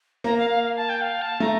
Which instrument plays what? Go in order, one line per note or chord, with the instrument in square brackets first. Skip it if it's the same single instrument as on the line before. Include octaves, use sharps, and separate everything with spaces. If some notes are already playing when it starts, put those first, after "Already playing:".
[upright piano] A#3 [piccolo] A#5
[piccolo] F5
F5
F5
A5
G5
F5
A5
[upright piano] A3 [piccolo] A#5